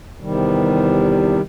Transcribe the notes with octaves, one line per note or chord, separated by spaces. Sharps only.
E2 C3 D#3 G3